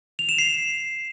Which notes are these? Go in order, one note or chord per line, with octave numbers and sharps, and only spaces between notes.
F7
E7
C7